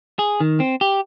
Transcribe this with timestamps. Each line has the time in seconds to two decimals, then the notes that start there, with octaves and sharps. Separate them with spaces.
0.19 G#4
0.40 D#3
0.60 C4
0.81 G4